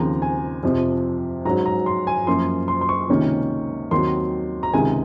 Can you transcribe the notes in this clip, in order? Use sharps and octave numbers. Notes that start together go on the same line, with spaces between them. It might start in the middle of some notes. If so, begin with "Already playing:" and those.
Already playing: D#2 C#3 F3 C4 A#5
G#5
F2 C3 F3 C4
G#2 F#3 C#4 A#5
A#5
C6
G#5
F#2 F3 A#3 C6
C6
C6
C#6
C#2 C3 D#3 A#3 C#4
D#2 D#3 F#3 C4 C6
A#5
C#2 C3 D#3 G#3 G#5